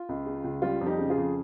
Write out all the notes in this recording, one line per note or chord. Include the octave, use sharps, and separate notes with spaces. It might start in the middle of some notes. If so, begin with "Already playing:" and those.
Already playing: F4
C#2
C#3
C#2
G3 F4
F2
D#4 G4
C#3
F4 G#4
F2